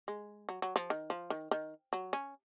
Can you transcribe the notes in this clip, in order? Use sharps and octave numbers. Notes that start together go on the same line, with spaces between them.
G#3
F#3
F#3
F3
D#3
F3
D#3
D#3
F#3
C#4